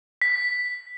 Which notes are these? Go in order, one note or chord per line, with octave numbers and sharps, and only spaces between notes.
B6